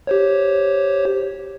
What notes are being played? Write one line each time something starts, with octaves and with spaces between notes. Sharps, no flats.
G4 C5 C#5